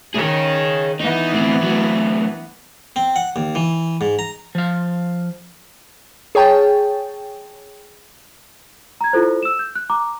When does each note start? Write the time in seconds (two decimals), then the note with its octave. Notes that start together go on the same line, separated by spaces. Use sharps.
0.14 D#3 G#4 C#5
1.01 E3 B3 D#4
1.33 A2 C4
1.63 A2 F#3
2.96 C4
3.16 F#5
3.36 D#2
3.55 E3
4.01 G#2
4.19 A#5
4.55 F3 F5
6.35 G#4 C#5 G5 A5
9.01 A#5 G#6
9.13 E4 F4 A4 C5
9.43 E6 E7
9.59 G6
9.75 F#6
9.90 A#5 D6